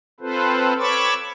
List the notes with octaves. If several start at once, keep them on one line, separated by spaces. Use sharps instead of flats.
C4 F4 A4 B4 C5
C#5 B5 C#6 D6 E6 A6